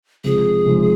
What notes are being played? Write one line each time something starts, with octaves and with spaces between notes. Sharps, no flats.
F1 F2 C3 F3 G#3 G#4
F1 F2 C3 F3 G#3